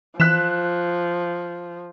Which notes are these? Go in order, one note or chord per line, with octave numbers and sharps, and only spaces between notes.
E3 F3 F#6 B6 E7